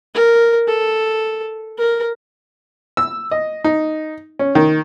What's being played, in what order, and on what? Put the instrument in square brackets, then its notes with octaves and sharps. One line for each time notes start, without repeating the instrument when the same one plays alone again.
[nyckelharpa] A#4
A4
A#4
[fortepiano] E6
D#5
D#4
C#4
D#3